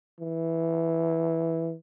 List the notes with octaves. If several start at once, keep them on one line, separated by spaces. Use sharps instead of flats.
E3